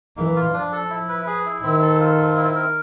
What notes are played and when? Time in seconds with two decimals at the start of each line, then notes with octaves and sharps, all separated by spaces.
0.17 E3 A#3
0.36 F4
0.53 F3 D4
0.72 A4
0.90 E4
1.09 B4
1.27 G#4
1.46 E4
1.63 D#3 C4
1.82 A4
2.00 F4
2.18 C4
2.37 E4
2.55 A#4